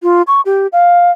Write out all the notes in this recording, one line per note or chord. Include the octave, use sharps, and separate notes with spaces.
F4
C#6
G4
F5